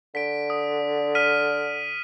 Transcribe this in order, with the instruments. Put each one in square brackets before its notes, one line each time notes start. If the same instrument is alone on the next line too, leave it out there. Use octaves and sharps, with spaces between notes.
[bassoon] D3 [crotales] B6 D7
[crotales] D#6
F6 B6 D#7